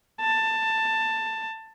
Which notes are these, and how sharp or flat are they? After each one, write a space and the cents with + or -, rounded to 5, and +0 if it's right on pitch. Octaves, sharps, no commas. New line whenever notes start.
A5 +15